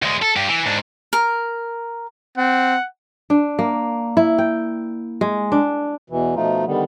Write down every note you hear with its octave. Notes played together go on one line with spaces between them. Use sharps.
D2 G#3
A4
G2 G4
E3
G#2 D4
A#4
C4 F#5
D4
A#3
E4
G5
G#3
D4
E2 B2 E3
B2 F3 A3 D#4 F4
D3 D#3 G3 B3